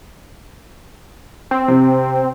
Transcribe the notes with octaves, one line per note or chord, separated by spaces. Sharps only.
C4
C3